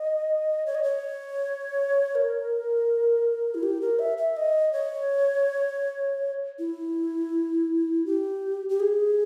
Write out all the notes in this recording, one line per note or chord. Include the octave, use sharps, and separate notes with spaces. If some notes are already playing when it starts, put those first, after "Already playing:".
Already playing: D#5
C#5
D#5
C#5
A#4
E4
G4
A#4
E5
E5
D#5
C#5
E4
G4
G4
G#4